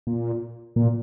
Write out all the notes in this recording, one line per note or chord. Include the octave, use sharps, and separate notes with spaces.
A#2
A#2